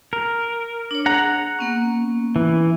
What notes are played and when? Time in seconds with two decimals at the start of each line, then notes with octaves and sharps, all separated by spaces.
0.13 A#4
0.91 D4 C#5
1.06 G#4 F#5 A#5
1.59 A#3 B3 C#4
2.36 E3